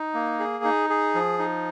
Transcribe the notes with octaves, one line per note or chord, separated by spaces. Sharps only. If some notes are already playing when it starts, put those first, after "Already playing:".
Already playing: D#4
A#3
G#4
D#4
G#4
F3
D#4